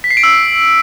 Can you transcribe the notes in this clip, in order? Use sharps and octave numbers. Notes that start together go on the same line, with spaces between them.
B6
C7
D7
E6